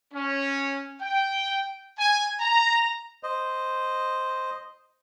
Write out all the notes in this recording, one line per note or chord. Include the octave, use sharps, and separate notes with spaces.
C#4
G5
G#5
A#5
C5 D#5